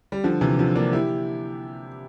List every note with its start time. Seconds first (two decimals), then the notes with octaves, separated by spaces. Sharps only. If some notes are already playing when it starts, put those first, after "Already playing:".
0.12 G3
0.24 D3 F3
0.41 C3 E3
0.59 D3 F3
0.75 A#3 D4
0.93 E4 G4